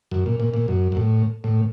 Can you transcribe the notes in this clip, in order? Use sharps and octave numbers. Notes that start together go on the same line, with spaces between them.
F#2
A#2
A#2
A#2
F#2
F#2
A2
A2